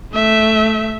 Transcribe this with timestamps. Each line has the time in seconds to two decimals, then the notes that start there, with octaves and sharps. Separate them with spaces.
0.13 A3 E5